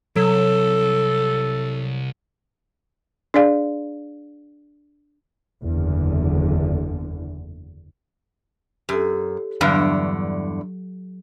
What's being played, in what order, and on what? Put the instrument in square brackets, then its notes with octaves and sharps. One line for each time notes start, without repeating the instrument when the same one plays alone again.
[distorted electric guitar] C2 [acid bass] F#3 [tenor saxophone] A4
[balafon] D4 G#4 D5 F5
[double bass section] F#1 E2 D3
[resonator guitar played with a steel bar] F#2 [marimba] G4 A4
[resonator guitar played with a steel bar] E2 G2 D3 [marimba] F#3